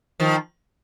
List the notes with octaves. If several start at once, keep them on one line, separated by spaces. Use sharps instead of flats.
D#3 F3